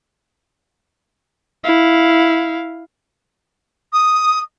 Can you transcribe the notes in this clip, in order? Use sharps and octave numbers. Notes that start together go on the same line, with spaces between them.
E4 F5
D#6